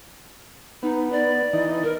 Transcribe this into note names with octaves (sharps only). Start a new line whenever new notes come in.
B3 D#4
D5
E3 D#4
A#4